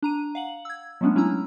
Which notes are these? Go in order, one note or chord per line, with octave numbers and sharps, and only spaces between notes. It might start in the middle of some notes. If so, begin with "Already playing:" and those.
D4 A#5 D#7
F5 F#5 F#7
E6 G#6
F#3 G#3 A3 B3 C#4 D4
F#3 C#4 D4 E4 A#5 E6